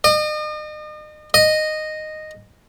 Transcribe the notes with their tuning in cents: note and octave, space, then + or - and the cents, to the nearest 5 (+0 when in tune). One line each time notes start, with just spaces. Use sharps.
D#5 -40
D#5 -10